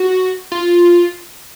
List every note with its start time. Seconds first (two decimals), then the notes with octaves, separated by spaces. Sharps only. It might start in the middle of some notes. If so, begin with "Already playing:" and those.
Already playing: F#4
0.52 F4